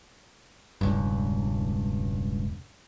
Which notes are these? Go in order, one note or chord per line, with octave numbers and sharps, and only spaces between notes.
E1 C#2 G2